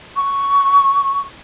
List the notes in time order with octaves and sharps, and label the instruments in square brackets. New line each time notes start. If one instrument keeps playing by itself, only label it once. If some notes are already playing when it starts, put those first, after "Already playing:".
[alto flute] C#6